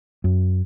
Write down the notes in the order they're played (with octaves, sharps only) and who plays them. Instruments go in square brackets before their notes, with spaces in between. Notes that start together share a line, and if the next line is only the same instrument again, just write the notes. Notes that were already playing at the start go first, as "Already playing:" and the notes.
[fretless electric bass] F#2